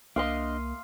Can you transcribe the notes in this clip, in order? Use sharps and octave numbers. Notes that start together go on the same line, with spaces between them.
C2 A#3 D4 D#5 F5 C6 D#6